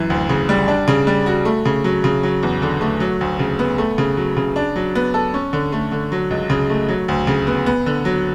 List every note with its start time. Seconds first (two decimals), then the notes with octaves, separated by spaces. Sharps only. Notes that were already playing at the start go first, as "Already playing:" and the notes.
Already playing: F#2 E3
0.10 D2
0.29 C#3
0.49 G3
0.68 D4
0.88 C#3
1.07 G3
1.26 F#4
1.45 A3
1.65 C#3
1.84 F#3
2.04 C#3
2.23 F#3
2.43 E2
2.62 D3
2.81 A3
3.00 F#3
3.21 D2
3.39 C#3
3.59 B3
3.78 A3
3.98 C#3
4.17 F#3
4.37 C#3
4.56 D4
4.76 F#3
4.95 B3
5.14 A4
5.34 C#4
5.53 D3
5.72 A3
5.92 D3
6.12 F#3
6.30 C#2
6.50 C#3
6.70 A3
6.88 F#3
7.08 D2
7.27 C#3
7.47 B3
7.66 B3
7.86 D3
8.05 F#3